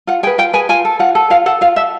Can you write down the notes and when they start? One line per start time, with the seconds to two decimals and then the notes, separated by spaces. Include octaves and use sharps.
0.07 F4 F#5
0.23 G#4 G5
0.27 B4
0.38 F4 G5
0.53 G#4 B4 G#5
0.69 F4 G#5
0.85 A4
0.99 F4 F#5
1.15 A4
1.30 F4 F5
1.46 A4 F#5
1.61 F4 F5
1.76 A4 E5